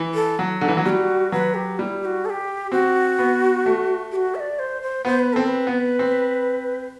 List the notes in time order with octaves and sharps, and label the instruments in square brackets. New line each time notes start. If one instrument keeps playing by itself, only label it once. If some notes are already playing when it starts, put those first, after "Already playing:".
Already playing: [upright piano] E3
[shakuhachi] A4
[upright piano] F#3
D3
E3
F#3
[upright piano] G3 [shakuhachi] F#4 G4
[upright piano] F#3 [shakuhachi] B4
[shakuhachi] G4
[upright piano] G3 [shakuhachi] E4
[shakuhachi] G4
F#4
A4
G4
[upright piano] C4 [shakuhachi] F#4
[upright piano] B3
A3
[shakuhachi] G4
F#4
E5
D5
C5
C5
[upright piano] B3 [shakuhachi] C5
[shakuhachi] B4
[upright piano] C4 [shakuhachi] A4
[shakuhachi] B4
[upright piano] B3
C4